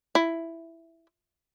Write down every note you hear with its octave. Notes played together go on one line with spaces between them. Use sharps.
E4